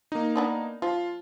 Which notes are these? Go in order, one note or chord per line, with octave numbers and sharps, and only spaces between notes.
A#3 D#4
B3 D4 B4
F3 F4